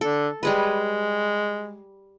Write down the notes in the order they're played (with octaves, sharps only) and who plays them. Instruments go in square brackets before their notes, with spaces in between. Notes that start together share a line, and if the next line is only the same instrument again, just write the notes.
[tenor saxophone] D3 [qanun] A4
[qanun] G3 G#4 B4 [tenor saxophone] G#3